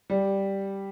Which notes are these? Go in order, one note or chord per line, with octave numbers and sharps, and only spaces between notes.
G3